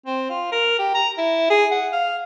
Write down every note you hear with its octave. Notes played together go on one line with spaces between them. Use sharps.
C4
F4
A#4
G4
A#5
E4
G#4
F#5
F5